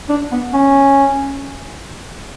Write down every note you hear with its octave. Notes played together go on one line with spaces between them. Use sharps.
D4
B3
C#4